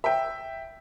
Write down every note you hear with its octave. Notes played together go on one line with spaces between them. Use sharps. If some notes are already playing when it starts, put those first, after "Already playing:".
E5 G5